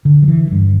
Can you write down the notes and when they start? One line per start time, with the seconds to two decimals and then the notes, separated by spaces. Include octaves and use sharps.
0.05 D3
0.22 F3
0.28 E3
0.52 G2